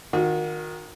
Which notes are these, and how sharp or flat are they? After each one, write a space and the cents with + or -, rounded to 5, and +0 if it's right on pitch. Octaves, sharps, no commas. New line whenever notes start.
D#3 +0 F#4 -40